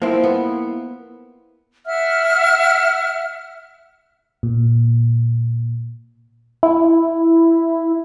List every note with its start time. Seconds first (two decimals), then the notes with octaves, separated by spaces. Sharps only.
0.02 F3 A#3 C4 E4
0.24 B3
1.86 E5 F#5 F6
4.43 A#2
6.63 E4